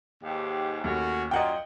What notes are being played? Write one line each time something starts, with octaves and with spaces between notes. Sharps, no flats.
D#2 G#2 G4
D#2 A2 C#4 F#4
F#2 A#2 F4 D#5 F#5 G5